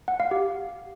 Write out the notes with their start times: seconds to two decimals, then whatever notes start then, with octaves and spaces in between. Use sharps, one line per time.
0.08 F#5
0.20 F5
0.31 G4